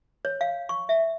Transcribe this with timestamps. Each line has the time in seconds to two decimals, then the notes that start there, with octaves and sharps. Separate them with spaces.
0.25 C#5
0.41 F5
0.69 C#6
0.89 E5